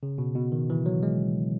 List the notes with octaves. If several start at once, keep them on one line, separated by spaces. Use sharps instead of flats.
C#3
B2
B2
D#3
E3
F#3
G#3